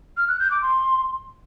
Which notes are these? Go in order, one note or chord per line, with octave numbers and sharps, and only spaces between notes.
F6
F#6
G6
D6
C6